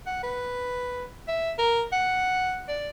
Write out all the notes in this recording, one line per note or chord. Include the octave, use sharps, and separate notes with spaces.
F#5
B4
E5
A#4
F#5
D5